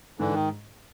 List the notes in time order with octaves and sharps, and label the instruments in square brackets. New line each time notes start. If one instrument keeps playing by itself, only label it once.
[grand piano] G#2 [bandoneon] D3 E3
[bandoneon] D#3